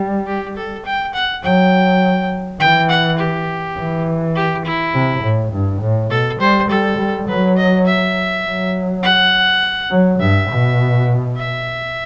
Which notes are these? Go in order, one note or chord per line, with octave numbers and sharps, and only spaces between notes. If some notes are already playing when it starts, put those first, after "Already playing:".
Already playing: G3
G4
A4
G5
F#5
F#3 G5
E3 G5
F#5
G4
E3
G4
E4
C3
A2
G2
A2
B2 A4
G3 C5
G3 A4
G3
F#3 B4
D#5
E5
F#3
F#5
F#3
G2 E5
B2
E5